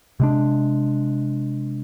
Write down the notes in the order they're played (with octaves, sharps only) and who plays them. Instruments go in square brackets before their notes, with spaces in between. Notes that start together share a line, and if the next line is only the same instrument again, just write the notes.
[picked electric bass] C3 G#3 D4